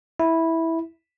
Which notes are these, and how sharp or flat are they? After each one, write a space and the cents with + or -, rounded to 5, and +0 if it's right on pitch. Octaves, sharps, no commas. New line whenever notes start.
E4 -10